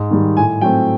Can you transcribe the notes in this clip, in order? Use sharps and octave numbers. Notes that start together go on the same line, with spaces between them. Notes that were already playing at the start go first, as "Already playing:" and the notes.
Already playing: G#2
D#3 G3
A2 G#5
F#3 A3 C4 G5